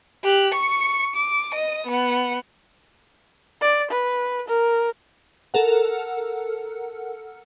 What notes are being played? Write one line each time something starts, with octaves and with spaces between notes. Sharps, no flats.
G4 F#6
C#6 C#7
D6
D#5 D#6
B3 F#5
D5
B4
A#4
A4 A#4 F#5